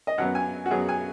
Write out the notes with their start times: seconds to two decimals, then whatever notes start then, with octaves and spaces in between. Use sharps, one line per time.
0.07 D#5
0.18 F#2 F#3 B3 F#5
0.35 G#5
0.66 F#4
0.71 F#2 F#3 B3 G#4
0.89 G#5